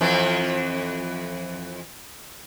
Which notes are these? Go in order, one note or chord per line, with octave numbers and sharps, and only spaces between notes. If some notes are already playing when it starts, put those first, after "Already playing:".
F2 E3